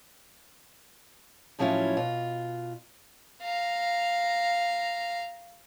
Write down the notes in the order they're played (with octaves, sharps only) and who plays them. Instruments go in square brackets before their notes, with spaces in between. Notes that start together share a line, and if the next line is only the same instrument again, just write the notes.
[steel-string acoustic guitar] A2 F3 F#3 C#4 E4 F4
B2 F4
[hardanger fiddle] F5 A#5